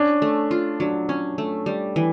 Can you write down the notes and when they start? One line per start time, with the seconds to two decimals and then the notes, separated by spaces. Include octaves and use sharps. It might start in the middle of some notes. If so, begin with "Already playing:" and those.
Already playing: C#4 D4
0.22 A3
0.51 F4
0.80 F#3 D4
1.09 C#4
1.38 A3
1.66 G3
1.96 E3